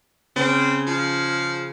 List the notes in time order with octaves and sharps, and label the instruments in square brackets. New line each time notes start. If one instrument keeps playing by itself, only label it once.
[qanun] C#3 [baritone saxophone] C4
[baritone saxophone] F3